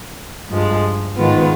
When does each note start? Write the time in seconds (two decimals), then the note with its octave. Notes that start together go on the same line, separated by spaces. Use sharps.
0.49 G2 F3 G#3
1.16 G#2 D#3 G#3 B3 F4